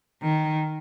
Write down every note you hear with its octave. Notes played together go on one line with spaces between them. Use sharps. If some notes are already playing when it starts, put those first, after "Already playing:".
D#3